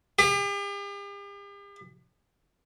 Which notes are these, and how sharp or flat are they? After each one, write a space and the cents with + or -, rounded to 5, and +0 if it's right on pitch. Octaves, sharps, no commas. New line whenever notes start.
G4 +45